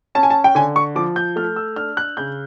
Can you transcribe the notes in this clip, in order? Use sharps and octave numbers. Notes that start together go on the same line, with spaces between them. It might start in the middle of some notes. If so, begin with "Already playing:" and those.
C#4 A5
G#5
A5
G5
D3 G#5
C#6
F3 D6
G6
A3 F6
E6
D4 F6
F#6
C#3 G6